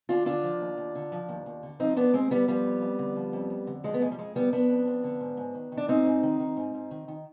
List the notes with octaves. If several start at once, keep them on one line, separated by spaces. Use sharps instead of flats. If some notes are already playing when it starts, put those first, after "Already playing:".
D#2 D4 F4
D3 D4 F4
F3
D#2
D#2
D3
F3
D#2
D#2
D3
F3 C4 D#4
D#2 B3 D4
D#2 G#3 C4
D3 G3 B3
F3 G3 B3
F2
F2
D3
F3
F2
F2
D3
F3 G#3
B3
F2 G#3
G3
F2 G#3
D3 G3 B3
F3 B3 D4
F2
F2
D3
G#2
G#2
D#3
D#3
D4
G#2 C4 D#4
G#2
D#3
D#3
G#2
G#2
D#3
D#3